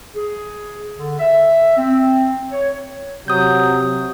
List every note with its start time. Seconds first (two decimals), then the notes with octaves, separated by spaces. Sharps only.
0.15 G#4
0.97 D3
1.19 E5
1.76 C4
2.52 C#5
3.28 C3 F#3 D#6 G6